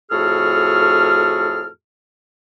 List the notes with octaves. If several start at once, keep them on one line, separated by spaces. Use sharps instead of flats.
F2 A2 F#4 G#4 A4 F6